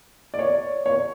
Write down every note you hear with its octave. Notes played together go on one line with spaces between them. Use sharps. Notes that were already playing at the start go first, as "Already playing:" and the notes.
D5
C#5
C#5